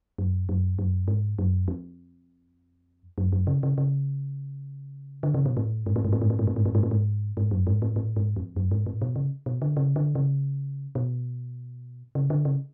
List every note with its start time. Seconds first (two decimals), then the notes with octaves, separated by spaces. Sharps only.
0.18 F#2
0.49 F#2
0.79 F#2
1.08 G#2
1.39 F#2
1.68 F2
3.18 F#2
3.33 F#2
3.47 C#3
3.63 C#3
3.78 C#3
5.23 D3
5.34 C#3
5.46 B2
5.57 A2
5.86 G#2
5.96 A2
6.05 G#2
6.13 A2
6.22 G#2
6.30 A2
6.39 G#2
6.47 A2
6.56 G#2
6.65 A2
6.75 G#2
6.83 A2
6.91 G#2
7.37 G#2
7.51 F#2
7.67 G#2
7.82 A2
7.96 A2
8.16 G#2
8.36 F2
8.56 F#2
8.71 G#2
8.86 A2
9.02 B2
9.16 C#3
9.46 B2
9.62 D3
9.77 C#3
9.96 D3
10.15 C#3
10.95 B2
12.15 C#3
12.30 D3
12.45 C#3